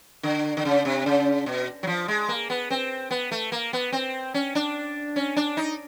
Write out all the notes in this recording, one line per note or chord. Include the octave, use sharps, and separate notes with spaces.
D3
D3
C#3
C3
C#3
B2
F#3
F3
G#3
A#3
B3
C4
B3
A3
A#3
B3
C4
C#4
D4
C#4
D4
D#4